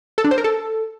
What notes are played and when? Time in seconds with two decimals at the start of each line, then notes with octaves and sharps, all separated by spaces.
0.18 A4
0.24 D4
0.31 C5
0.38 A#4
0.44 A4